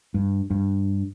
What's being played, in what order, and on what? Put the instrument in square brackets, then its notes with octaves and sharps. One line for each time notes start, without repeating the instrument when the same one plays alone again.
[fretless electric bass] G2
G2